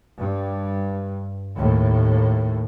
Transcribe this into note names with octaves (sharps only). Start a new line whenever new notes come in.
G2
D#2 A2